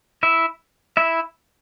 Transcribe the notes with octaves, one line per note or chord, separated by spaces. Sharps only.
E4 E5
E4 E5